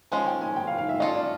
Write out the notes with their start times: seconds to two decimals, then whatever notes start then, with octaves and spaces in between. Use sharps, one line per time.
0.12 F3 G#3 C#4 G#5
0.26 G5
0.41 G#5
0.56 G5
0.67 F5
0.78 F5
0.89 E5
1.00 C#4 F4 A4 D#5
1.15 D5